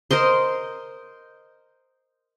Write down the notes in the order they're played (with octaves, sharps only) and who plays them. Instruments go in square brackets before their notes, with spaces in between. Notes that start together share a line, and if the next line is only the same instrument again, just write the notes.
[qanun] A#4 C5 D#5 C6